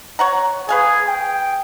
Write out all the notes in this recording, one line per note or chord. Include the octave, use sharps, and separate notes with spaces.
C#5 F#5 A#5
G#4 B4 F5 G#5
G5